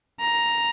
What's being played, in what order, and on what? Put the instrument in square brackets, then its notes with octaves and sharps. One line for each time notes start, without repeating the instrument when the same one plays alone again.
[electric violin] A#5